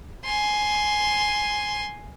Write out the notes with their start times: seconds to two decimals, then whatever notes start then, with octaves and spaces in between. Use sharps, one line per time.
0.24 G#5 C6